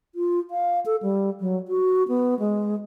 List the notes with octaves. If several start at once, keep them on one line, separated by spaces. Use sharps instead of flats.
F4
F5
A4
G3
F#3
F#4
B3
G#3